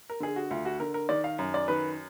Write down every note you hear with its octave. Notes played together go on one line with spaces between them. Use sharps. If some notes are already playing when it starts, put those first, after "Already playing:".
A#4
D3 G#4
F#4
D2 F4
F#4
D3 A#4
A#4
D#3 D5
F5
F#2
D5
D#3 B4